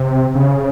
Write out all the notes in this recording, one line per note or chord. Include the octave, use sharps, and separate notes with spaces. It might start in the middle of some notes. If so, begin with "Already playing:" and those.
Already playing: C3
C#3